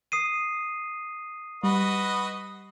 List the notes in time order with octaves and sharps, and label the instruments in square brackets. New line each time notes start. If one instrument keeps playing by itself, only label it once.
[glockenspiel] D#6 C7 D#7
[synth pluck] G3 [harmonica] F#4 B4 D#5